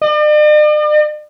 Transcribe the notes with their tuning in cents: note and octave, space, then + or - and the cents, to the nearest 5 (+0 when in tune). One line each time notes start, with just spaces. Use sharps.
D5 +45